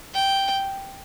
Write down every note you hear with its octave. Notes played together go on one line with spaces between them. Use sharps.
G5